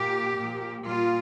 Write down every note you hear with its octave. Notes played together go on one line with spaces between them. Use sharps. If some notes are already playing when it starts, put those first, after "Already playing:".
Already playing: A#2 A#3 G4
A#2 F3 A#3
A#2 G3 A#3 F4